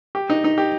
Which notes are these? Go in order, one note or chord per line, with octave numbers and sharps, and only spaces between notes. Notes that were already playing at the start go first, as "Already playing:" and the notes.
G4
D#4
D#4
G4